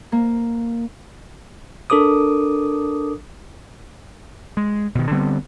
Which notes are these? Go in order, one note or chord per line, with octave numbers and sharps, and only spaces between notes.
A#3
D4 A4 A#4 D6 D#6
G#3
B2 D#3
D3 G3 B3 C4